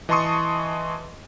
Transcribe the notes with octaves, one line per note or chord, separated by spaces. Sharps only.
E3 D#5 A5 C6 C#6 D#6